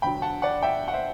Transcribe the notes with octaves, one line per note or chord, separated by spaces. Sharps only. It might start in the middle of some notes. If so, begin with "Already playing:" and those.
E1 D2 D3 F#3 G5 B5
F#5 A5
D5 F#5
E5 G5
F#5
C5 E5